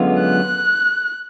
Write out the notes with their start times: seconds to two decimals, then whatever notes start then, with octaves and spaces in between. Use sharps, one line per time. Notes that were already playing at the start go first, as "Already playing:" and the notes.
Already playing: F#2 D3 G#3 B3 F4
0.21 F#6